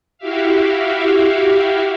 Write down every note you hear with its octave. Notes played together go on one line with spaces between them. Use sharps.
E4 F#4 G4 E5 F5